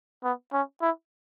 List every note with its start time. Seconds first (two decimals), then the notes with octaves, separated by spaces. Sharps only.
0.24 B3
0.53 C#4
0.81 E4